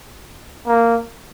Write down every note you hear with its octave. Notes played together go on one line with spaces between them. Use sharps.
A#3